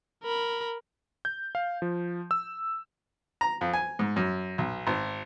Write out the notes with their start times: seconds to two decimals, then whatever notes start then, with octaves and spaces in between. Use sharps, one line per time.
0.23 A#4 B5
1.25 G6
1.55 F5
1.82 F3
2.31 E6
3.41 A#5
3.61 F2
3.73 G#5
3.99 G#2
4.16 F#2
4.58 B1
4.87 G#1